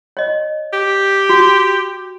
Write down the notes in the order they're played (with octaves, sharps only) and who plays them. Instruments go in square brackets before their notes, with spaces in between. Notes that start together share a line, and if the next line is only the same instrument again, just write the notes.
[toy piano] C#5 D#5
[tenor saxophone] G4
[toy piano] F#4